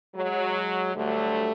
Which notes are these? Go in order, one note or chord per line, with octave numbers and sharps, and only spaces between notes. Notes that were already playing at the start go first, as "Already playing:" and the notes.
F#3 G#3
D2 D3 F#3 G3 A3